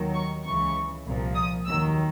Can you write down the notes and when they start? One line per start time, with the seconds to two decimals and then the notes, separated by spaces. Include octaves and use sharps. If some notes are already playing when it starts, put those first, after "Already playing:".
Already playing: D#2 D#3 F#3
0.14 C#6
0.44 C#2 C#3 E3 C#6
1.05 C2 A#2 F3
1.35 D#6
1.65 D#2 D#3 F#3 E6